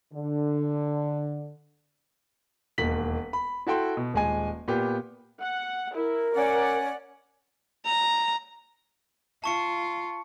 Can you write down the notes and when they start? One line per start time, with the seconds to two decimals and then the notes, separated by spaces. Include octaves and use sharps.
0.13 D3
2.78 E1 D#2 B6 F#7
3.33 B5
3.67 E4 F#4 A4 G5 C6
3.97 B2
4.14 D#1 G#3 G#5
4.68 A#2 B3 G4
5.41 F#5
5.95 E4 A#4
6.35 C#4 D5 F#5
7.86 A#5
9.44 F4 A5 C#6 C#7